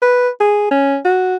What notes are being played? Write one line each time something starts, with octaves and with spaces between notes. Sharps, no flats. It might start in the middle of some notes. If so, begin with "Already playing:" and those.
B4
G#4
C#4
F#4